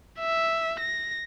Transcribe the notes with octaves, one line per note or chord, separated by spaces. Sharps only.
E5
A#6